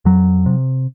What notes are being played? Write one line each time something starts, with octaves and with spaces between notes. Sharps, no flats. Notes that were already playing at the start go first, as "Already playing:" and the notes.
F2 F#3
C3